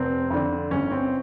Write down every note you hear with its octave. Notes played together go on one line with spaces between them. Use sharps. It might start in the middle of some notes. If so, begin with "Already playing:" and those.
Already playing: F1 C4
F2 D3
G1 C#4
C4